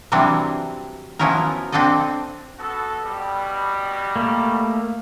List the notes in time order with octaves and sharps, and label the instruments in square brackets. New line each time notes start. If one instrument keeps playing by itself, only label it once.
[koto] C3 E3 F#3 G3 C4 D4
F3 F#3 B3 C#4 E4 A#4
C4 D4 A4 D5 D#5
[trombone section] B3 F#4 A4
B2 G3
[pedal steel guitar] A3 A#3